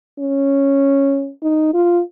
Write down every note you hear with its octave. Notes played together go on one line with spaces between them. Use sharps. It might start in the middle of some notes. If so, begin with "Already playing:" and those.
C#4
D#4
F4